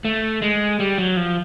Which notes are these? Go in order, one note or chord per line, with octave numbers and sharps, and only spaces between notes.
A3
G#3
G3
F#3
F3